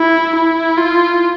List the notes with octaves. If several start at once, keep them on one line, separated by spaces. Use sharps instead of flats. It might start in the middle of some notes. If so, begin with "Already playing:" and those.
Already playing: E4
E4
F4